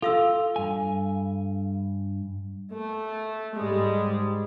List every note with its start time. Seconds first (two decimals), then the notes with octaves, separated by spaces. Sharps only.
0.02 F4 A4 F5 E6
0.56 G2 G#5
2.73 A3
3.56 G#2 G3 G#3